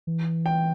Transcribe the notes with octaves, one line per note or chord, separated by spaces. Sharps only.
E3
G5